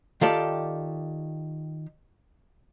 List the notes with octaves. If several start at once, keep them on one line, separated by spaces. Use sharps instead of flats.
D#3 F4 G4 A4 D5